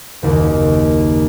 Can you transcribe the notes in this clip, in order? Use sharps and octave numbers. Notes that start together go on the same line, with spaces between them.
F#1 D#2